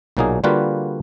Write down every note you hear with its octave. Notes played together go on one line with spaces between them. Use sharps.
B1 A#2 F#3 A#3 D#4 G#4
D3 G3 A#3 F4 F#4 B4